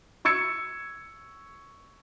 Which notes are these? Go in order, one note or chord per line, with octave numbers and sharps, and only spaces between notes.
C#6 E6 G#6 C#7